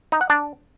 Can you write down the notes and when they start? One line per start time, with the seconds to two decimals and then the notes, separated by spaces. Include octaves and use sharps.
0.12 D#4
0.21 F#5
0.30 D4